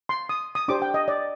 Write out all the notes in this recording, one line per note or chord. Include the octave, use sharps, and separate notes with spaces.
C6
D#6
D#6
D4 G4 C5 D6
G5
D#5
D5